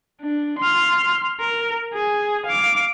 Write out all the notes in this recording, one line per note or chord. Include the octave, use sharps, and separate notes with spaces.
D4
C6 F6
A#4
G#4
F5 D6